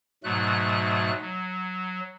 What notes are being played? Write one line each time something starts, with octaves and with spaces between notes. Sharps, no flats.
G#2 B2 F#3 A3 F#6
F#3